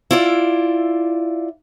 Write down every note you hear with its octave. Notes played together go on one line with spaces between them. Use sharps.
E4 F4 D5